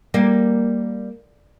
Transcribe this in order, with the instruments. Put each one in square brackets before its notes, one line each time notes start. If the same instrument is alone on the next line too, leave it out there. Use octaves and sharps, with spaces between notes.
[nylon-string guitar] G3 [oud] A#3